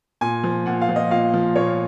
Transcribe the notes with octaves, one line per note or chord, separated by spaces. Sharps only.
A#2 G#5
F3
A#2 F#5
F5
F3
D#5
A#2 F5
F3
A#2 C#5